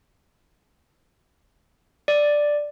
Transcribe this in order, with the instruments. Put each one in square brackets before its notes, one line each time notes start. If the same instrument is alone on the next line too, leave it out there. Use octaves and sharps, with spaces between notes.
[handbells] D5